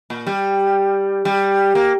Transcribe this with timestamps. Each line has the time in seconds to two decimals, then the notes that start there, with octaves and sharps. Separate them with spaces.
0.10 A#2
0.27 G3
1.25 G3
1.75 A#3